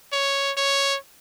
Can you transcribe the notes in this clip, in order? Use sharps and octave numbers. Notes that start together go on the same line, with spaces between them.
C#5
C#5